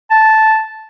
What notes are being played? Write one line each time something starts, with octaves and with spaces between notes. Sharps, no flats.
A5